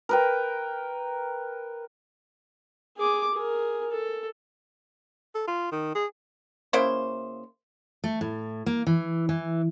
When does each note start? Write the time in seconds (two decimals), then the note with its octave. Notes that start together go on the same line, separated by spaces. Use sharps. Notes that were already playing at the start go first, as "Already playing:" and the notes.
0.09 A#4 B4 G5
2.98 G#4 D6
3.34 G#4 A#4
3.91 A4
5.35 A4
5.47 F4
5.72 D#3
5.95 G#4
6.73 C#3 A#3 E4 C5
8.04 A3
8.21 A2
8.66 A#3
8.87 E3
9.29 E3